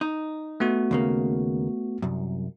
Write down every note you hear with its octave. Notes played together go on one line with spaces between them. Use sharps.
D#4
A3 B3 F#4
D#2 C#3 A#3
C2 F#2